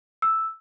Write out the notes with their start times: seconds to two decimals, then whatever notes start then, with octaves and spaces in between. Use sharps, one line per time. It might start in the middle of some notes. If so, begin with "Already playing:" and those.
0.22 E6